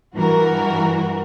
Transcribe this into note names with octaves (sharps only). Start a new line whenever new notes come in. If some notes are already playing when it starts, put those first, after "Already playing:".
G2 E3 F#4 A#4